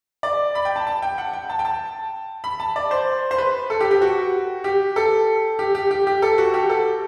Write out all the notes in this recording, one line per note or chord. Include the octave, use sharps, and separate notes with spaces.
D5
B5
G5
A5
A5
G5
F#5
G5
A5
G5
A5
B5
A5
D5
C5
C5
B4
A4
G4
G4
F#4
G4
A4
G4
G4
G4
G4
A4
F#4
G4
A4